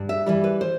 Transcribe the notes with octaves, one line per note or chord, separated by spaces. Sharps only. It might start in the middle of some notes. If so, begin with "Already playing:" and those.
Already playing: G2
E5
E3 G3 E5
B4
C5